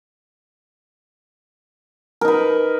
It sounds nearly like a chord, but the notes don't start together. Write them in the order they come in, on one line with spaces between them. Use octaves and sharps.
A#4 D#4 B4